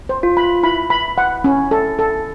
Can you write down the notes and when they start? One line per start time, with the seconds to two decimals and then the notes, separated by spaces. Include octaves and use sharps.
0.09 C5
0.23 F4
0.37 B5
0.63 E4 B5
0.90 B5
1.18 F#5
1.44 C#4
1.71 A4
1.99 A4